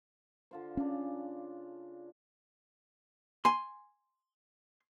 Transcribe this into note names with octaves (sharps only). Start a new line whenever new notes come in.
D3 F4 C5
C#3 C#4 D4
G#5 C6